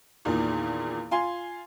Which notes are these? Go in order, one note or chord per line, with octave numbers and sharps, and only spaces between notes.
E2 A#2 D#3
F4 G#5 C6